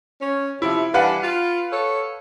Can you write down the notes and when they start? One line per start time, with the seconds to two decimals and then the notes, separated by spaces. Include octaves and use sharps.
0.21 C#4
0.62 C3 F3 E4
0.94 E3 G3 D4 B4 F5 F#5
1.23 F4
1.72 A4 C#5